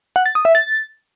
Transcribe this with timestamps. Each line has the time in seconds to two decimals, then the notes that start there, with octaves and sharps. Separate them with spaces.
0.16 F#5
0.26 A6
0.35 D#6
0.45 E5
0.55 A6